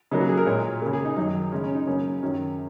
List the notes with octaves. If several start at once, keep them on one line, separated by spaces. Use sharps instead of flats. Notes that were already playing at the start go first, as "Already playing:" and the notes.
C#3 F#3 A#3 D#4
F#4
G#4
A#4
A#2 G#3 C#5
C#3 A#3
G#4
D#4
F#2 D#3 F#3 D#4
C#3 G#3 C#4
C#4
D#4
C#3 F#3 A#3 C#4
F#2 D#3 F#3 C#4